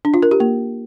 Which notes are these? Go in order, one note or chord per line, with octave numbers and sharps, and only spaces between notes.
D4
F4
A#4
G4
A#3